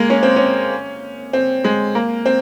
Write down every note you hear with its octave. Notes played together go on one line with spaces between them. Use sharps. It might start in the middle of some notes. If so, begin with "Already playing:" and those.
Already playing: G#3 A#3
C#4
C4
C#4
C4
G#3
A#3
C4